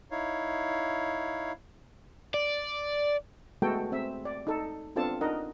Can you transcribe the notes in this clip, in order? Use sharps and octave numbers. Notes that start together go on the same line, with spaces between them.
D#4 E4 C#5 F5
D5
G#3 A3 B3 F#4 A4 G5
C4 E5
D5
D#4 A4
B3 C4 D4 F4 A4 A5
D4 D#4 A#4 D#5 F#5